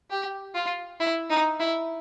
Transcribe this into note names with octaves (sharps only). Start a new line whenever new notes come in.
G4
F4
E4
D#4
E4